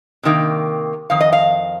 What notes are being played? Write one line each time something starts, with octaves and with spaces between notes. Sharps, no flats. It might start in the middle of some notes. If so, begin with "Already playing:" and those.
C3 D#3 A#3
F2 D#3 F5
D#5
F5